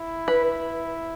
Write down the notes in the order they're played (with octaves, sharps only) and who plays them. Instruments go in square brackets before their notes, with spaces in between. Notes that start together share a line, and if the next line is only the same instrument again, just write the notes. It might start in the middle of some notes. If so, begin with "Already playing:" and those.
Already playing: [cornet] E4
[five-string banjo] B4